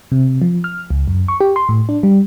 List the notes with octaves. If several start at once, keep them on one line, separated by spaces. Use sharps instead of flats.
C3
F3
F6
C#2
F#2
C#6
G4
C6
A2
D4
G3